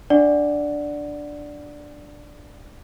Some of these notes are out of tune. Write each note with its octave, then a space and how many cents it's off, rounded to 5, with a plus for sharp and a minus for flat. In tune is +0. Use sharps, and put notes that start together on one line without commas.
D4 +0 D5 +0 F#5 +0